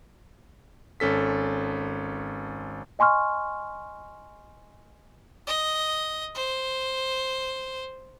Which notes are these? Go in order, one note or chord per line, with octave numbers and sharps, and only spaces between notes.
G#1 C#4 A4 B6
D#5 G#5 C6 C#6 F6
D#5
C5